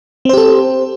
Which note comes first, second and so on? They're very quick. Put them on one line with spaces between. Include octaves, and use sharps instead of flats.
C4 C5 G4 A4